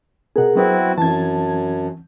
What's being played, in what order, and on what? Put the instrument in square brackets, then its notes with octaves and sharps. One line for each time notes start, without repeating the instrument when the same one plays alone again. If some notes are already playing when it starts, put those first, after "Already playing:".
[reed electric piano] B2 B3 [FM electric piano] G#4 A#4 F#5
[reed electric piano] F#3 B3 C5 [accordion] C4 E4 F#4
[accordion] F#2 [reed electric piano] E3 C4 [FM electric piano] A5 G#6